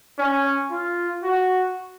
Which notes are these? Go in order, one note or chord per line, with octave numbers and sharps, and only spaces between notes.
C#4
F4
F#4